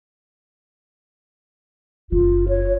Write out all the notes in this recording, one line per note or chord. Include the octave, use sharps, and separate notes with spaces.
F#1 D3 F4
C#5